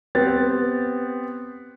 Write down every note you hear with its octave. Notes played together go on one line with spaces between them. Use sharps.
B3 C4 G4 A6